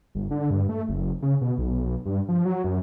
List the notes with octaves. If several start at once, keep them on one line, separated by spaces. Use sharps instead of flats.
G1
D3
G2
A3
F#1
C#3
B2
B1
G2
F3
F#3
F#2